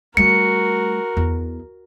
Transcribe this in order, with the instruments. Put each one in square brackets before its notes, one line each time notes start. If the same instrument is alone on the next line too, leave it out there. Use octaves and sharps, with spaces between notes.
[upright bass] G3 A3 [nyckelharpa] F#4 A#4 [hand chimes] C#7
[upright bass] E2